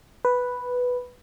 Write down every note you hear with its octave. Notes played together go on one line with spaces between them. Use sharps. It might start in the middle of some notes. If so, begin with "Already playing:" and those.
B4